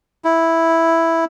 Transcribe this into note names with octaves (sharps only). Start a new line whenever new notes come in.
E4